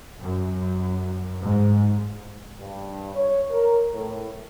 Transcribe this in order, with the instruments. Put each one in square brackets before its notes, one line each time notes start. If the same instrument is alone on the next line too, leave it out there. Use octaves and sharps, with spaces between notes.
[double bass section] F#2
G#2
[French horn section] G2
C#5
A#4
A2